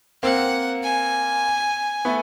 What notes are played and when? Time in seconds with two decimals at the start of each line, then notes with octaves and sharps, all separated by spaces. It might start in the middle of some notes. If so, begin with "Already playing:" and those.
0.23 A#3 C4 F#5
0.84 G#5
2.05 A3 B3